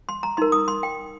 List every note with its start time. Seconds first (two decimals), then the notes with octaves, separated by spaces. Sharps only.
0.09 C6
0.23 A#5
0.37 D#4 A#4 C6
0.52 D#6
0.68 C6
0.83 G5